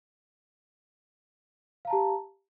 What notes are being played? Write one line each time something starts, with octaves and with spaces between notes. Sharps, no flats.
G4 F5 A5 A#5